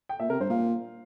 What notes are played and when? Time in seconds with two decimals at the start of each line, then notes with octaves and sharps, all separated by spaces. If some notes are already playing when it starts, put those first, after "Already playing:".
0.09 G5
0.20 A#2 E5
0.30 C3 A#4
0.40 G2 C5
0.50 A#2 F5